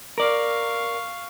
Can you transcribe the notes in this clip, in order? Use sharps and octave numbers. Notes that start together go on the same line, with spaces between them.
A#4 D5 F5 C#6